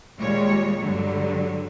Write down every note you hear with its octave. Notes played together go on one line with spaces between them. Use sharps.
D#2 A#2 G3 G#3 C#5
G2 D3 F#3